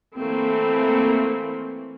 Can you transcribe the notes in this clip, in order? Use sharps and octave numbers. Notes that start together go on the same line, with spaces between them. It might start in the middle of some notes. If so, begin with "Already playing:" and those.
E3 A3 A#3 C4